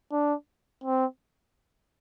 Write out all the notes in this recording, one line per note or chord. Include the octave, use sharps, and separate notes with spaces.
D4
C4